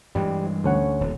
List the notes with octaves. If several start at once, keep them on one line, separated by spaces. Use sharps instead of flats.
G2 E3 G3 G#3
D2 C#4 F#5
D#1